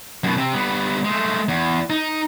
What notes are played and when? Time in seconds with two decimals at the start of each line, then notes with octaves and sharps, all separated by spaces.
0.24 F#2 B2
0.38 C3 C4
0.54 G3 B3
1.05 G#3 A3
1.49 E2
1.90 D#4